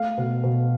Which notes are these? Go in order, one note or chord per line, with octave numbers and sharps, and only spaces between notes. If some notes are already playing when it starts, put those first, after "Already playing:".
Already playing: A3 F5
B2
B2